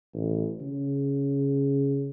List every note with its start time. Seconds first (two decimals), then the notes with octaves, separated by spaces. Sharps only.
0.14 A1
0.61 C#3